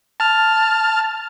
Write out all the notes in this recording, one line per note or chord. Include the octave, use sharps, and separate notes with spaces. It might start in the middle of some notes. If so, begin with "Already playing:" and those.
A5 F6